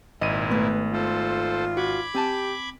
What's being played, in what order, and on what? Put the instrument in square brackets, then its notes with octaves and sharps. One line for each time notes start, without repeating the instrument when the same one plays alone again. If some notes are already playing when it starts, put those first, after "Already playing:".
[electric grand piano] G#1 D#7 [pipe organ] A#2 E4 [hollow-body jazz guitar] D#5
[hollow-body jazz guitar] A3 B3 [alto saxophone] B4
[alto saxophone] F4 [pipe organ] A4 C5
[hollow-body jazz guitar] F#4 [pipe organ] B5 D6 G#6
[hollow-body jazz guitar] C4 G#5 A5 [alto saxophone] G4